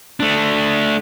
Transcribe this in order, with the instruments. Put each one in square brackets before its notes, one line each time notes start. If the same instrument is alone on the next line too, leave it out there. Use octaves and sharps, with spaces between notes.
[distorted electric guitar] A3 D4